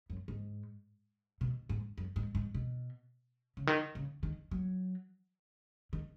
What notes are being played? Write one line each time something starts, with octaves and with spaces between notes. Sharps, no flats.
F#2
G#2
B2
G#2
F#2
G#2
G#2
B2
C#3
D#3
C#3
D#3
F#3
D#3